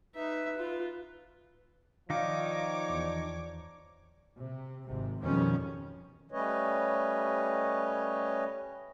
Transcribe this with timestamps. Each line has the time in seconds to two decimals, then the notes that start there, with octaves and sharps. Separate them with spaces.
0.15 D#4 B4 E5
0.58 F4
2.10 D#3 F3 D#4 C#5 D5 F5 D6
2.90 E2
4.41 C3
4.89 G#1 G#2 C3
5.22 F2 B2 D#3 F3 G3 C#4
6.32 G3 A3 C#4 B4 C#5 D#5